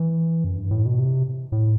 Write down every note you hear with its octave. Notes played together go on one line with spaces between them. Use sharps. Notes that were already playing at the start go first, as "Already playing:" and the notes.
Already playing: E3
F#2
G2
A2
B2
C3
A2